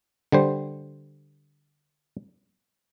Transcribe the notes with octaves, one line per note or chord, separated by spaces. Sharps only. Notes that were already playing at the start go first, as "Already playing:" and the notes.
D3 G3 C5